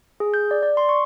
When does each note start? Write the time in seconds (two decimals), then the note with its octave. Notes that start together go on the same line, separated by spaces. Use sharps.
0.20 G#4
0.34 G6
0.51 D5
0.63 D5
0.77 C6
0.89 C#6